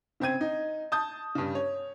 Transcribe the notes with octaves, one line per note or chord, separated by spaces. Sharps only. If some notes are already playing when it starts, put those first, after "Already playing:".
C#3 C4 G5 G#6 D#7
D#4
A5 D#6 G6
G2 C#3
C#5